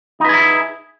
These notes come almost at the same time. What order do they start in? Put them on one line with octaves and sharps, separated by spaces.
D#4 B4 G#4 E4